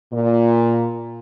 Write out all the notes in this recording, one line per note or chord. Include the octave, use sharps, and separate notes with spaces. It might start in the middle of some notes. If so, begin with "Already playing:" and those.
A#2